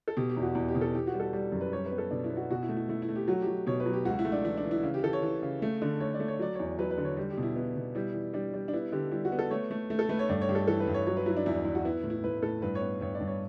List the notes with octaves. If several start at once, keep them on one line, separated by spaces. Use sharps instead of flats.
A4
B2 G4
G4
E2
F#4
E2
G4
B2
A4
E3 G4
F#4
G3
A4
G3
F#2
B4
G3 C#5
B4
B3
A4
B2 D4
E4
B3
F#4
B2 F#4
E4
A3
E4
A3 E4
E4
A3
G4
F#3 F#4
G4
F#3
B2 C#5
B4
F#3
G4
C#2 F#4
E4
A3
D4
E3 E4
D4
E3
E4
C#3
G4
E3 A4
C#5
E3
C#3
A3
D3
A3 C#5
D5
A3
C#5
F#3 D5
E2 C#5
F#3 B4
B4
D3
C#5
G3
G4
B2
E4
B3 E4
B2
G3 E4
E3
G3 D4
G3
D4
B3 E4
D3 G4
G3 E4
F#4
B3
A4
A3 C#5
A3
A3
A4
A3 B4
C#5
G2 D5
C#5
G2 G4
A4
E3 A4
B4
G2
C#5
F#3 C#5
B4
F#3 E4
D4
E2 E4
E2
F#4
B3 E4
A2
E4
A2 B4
A2 A4
G2 B4
C#5
B3
G2 C#5
D5
G2
C#5